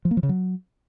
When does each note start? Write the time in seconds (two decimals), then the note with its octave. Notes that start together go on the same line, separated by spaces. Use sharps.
0.05 F3
0.11 A#3
0.17 F3
0.23 C#3
0.29 F#3